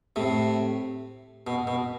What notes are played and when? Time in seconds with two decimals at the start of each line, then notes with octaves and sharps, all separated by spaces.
0.16 A2 C3
1.47 B2
1.67 B2